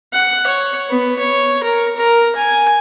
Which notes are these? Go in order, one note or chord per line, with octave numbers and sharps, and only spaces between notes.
F#5
C#5
B3
C#5
A#4
A#4
G#5